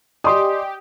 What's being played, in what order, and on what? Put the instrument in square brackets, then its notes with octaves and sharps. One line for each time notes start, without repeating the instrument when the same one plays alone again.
[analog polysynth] G4 [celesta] D5 D#5 G#5 [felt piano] C6 D#6